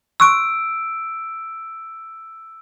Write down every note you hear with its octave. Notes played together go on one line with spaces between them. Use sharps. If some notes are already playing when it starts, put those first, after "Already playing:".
C6 C#6 E6 F#6 D7